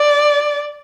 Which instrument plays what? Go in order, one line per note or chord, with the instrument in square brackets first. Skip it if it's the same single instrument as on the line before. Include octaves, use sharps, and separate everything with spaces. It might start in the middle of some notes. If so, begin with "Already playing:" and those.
Already playing: [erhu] D5